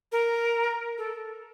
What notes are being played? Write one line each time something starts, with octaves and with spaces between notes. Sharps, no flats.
A#4
A4